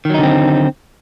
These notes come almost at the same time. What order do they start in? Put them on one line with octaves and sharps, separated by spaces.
D#3 F#3 D#4 D3 C4